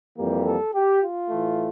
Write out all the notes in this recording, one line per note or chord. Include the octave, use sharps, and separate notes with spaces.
F2 E3 G3 A#3 G4
A4
G4
F4
A2 E3 A3